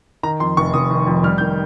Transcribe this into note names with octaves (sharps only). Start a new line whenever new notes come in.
D#3 A#5
F2 C6
F1 C#6
F1 D#6
D#3
F2
G3 F6
D#3 G6